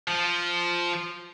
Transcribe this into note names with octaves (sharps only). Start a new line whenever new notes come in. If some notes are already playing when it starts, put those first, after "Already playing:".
F3